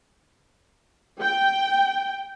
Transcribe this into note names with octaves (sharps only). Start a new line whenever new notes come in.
G5